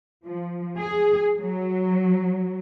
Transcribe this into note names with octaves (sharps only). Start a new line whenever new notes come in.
F3
G#4
F#3